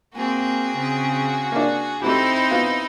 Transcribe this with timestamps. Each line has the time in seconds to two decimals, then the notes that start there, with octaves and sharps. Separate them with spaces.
0.15 A#3 C4 F#4 G#4
0.77 C#3 C4
1.52 A#3 D4
2.02 A3 C4 D#4 E4 F#4 G4 C5
2.51 B3 F4 F#4